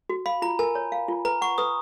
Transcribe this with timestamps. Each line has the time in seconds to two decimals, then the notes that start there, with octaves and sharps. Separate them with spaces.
0.09 F#4
0.26 F5 B5
0.42 F4 A#5
0.59 A#4 G#5
0.75 C#5
0.92 F5
1.08 F4
1.25 B4 A#5
1.41 F#5 C#6
1.58 B4 D#6